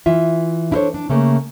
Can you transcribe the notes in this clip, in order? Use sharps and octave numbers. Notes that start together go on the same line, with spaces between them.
E3 F4 E5
D4 E4 A4 A#4 C5 C#5
D4
C#3 A3 A#3